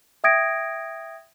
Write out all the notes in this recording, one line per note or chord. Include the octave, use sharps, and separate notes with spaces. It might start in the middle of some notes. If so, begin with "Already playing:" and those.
E5 G5 D#6 G#6 A#6 D7